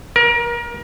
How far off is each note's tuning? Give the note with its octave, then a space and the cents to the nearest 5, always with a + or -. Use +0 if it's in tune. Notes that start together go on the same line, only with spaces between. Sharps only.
A#4 +25